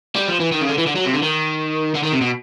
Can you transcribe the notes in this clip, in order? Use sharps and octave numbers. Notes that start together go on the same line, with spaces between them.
G3
F3
E3
D#3
C#3
D3
E3
D3
F#3
C3
D3
D#3
D3
D#3
C3
B2